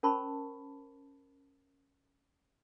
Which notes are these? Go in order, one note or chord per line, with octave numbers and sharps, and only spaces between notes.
C#4 A#4 C5 A5 B5 C#6